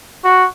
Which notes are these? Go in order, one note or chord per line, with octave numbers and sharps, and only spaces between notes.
F#4